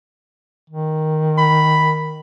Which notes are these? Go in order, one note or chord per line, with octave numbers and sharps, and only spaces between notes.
D#3
B5